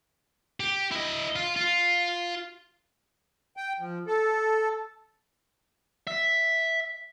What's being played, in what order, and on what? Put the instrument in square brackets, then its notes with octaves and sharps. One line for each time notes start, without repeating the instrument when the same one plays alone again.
[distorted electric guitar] G4
E4 D#5
F4
F4
[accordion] G5
F3
A4
[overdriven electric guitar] E5